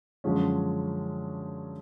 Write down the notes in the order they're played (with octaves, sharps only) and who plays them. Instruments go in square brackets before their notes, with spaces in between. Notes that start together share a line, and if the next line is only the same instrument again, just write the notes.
[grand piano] F#2 D3 F3 G#3 C#4